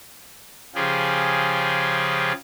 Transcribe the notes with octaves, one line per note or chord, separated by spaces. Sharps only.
C#3 F3 F4 G4 G#4